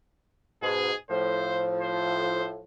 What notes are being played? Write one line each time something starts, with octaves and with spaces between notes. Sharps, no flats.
G#2 B2 G#4
A2 F3 C5
C5